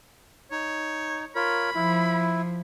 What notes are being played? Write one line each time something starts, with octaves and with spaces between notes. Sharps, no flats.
D#4 C#5
F4 A#4 C#5 B5
F3 E4